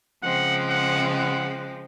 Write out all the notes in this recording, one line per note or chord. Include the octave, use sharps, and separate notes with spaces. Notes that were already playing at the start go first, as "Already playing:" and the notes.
C#3 F3 G#3 C4 F#5
F#5
F#5